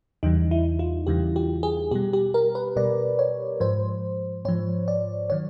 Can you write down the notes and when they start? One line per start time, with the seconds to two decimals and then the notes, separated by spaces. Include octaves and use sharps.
0.23 E2 C#3 E3 G3 D#4
0.51 E4
0.79 F4
1.07 E2 C#3 E3 G3 G4
1.36 G4
1.63 G#4
1.91 B2 G3 G4
2.13 G4
2.34 A#4
2.55 B4
2.76 B2 G3 D5
3.19 C#5
3.60 G#2 F3 C5
4.45 G#2 F3 C#5
4.88 D5
5.30 D#3 F#3 C#5